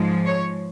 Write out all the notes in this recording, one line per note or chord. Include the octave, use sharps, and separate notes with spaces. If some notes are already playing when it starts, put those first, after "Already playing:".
Already playing: G#2 F3 G#3
C#5